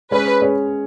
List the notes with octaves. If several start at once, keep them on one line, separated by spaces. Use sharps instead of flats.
G#3 C#4 G#4 B4 C#5
G#3 C#4 G#4 C#5